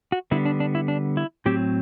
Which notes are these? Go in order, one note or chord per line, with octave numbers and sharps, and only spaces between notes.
F#4
D3 G3 B3 E4
D4
D4
E4
D4
E4
A2 F#3 C4 G4